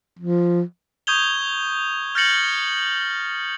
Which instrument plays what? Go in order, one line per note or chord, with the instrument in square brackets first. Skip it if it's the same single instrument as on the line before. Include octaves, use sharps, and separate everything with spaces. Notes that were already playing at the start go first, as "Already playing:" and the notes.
[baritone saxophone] F3
[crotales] C#6 D#6 G6 G#6 F7 G7
F6 G6 A6 A#6 C#7 F#7